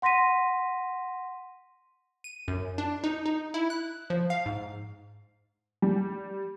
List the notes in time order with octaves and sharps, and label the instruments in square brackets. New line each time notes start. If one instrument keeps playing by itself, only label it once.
[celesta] F#5 C6 A#6 B6 D#7
[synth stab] D#7
F#2
D4
D#4
D#4
E4
F#6
F3
F5
G#2
[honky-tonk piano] G3